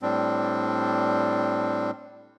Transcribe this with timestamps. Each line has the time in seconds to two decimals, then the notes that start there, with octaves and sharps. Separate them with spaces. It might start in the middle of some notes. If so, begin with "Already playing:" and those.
0.02 A2 G3 C4 D4